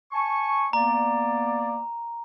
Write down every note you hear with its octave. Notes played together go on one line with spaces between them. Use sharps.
G#5 A5 C#6
A#3 B3 D5 A#5